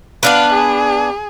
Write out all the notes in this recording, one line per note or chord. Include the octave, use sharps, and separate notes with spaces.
B3 D4 B4 F5
G#4